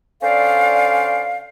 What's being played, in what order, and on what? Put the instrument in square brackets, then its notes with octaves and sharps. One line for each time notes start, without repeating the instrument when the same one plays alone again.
[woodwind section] D3 C#4 A4 C5 D5 F5